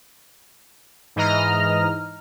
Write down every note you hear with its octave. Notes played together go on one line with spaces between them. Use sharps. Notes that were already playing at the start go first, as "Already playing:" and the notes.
G#2 E3 D#5 A#5 F6